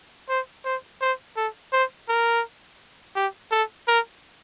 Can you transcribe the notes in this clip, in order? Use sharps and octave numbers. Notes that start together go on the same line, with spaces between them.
C5
C5
C5
A4
C5
A#4
G4
A4
A#4